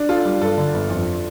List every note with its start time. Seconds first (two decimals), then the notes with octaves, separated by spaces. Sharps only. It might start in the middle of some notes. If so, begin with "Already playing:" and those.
Already playing: D4
0.09 F4 A4
0.25 G3
0.41 G2 A4
0.58 D3
0.74 G1
0.90 F2